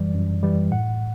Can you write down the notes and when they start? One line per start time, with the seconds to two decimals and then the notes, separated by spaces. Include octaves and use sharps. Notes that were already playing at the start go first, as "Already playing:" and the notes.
Already playing: F#2 E3 G3 D5
0.14 F#2
0.43 E3 G3
0.71 A2 F#5